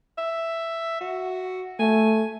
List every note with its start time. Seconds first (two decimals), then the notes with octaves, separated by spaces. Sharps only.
0.18 E5
1.01 F#4
1.79 A3 G#5